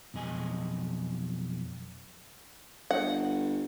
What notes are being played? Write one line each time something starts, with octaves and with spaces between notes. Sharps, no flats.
B1 F2 G#4 D#5 G#5
G1 F#5